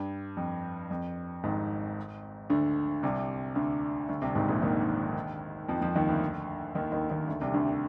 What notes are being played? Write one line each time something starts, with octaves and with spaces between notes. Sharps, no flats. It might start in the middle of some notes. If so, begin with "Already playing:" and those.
Already playing: G2
F2
F2
G#1 G#2
D2 D3
C2 C3
D2 D3
D2 D3
C2 C3
G#1 G#2
A#1 A#2
D#2 D#3
F2 F3
F2 F3
D#2 D#3
D2 D3
D#2 D#3
D#2 D#3
D#2 D#3
D2 D3
C2 C3
D2 D3
D3